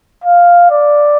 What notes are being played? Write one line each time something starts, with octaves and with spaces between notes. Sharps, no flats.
F5
D5